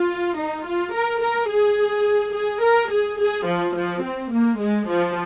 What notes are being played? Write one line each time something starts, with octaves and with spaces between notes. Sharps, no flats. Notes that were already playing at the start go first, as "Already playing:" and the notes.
Already playing: F4
D#4
F4
A#4
A#4
G#4
G#4
A#4
G#4
G#4
F3
F3
C4
A#3
G#3
F3